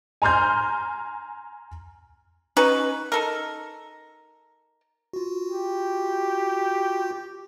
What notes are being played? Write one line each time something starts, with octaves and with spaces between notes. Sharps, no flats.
G#5 A#5 C6 F6 G6
C#4 D#4 F#4 B4
D#4 A4 A#4
F4 F#4
G4